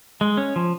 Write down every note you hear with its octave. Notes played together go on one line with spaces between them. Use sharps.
G#3
C#4
F3